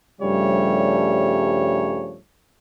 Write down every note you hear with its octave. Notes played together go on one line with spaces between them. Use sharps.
G2 C#3 F3 G3 A3 C#5